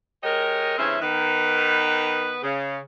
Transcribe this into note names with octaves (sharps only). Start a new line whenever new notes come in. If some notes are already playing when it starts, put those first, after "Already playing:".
G#3 G4 A#4 C#5 D#5
G2 C#3 E3 C4 C#4 E5
D#3 B3 B4
C#3